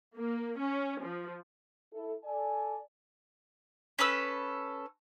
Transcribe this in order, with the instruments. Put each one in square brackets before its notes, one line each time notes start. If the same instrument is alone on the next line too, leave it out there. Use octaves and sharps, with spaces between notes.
[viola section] A#3
C#4
F3
[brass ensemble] E4 A4
A4 D5 G#5
[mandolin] C#4 A4 B4 E6